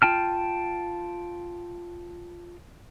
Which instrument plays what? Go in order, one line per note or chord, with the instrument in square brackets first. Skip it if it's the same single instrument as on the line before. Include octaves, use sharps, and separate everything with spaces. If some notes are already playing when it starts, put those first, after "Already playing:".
[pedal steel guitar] F4 G5 A5 F6